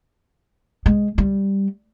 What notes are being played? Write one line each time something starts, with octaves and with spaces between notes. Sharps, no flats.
G#3
G3